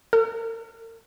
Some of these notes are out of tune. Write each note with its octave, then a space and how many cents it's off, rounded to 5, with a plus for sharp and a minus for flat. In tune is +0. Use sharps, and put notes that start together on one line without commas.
A#4 -40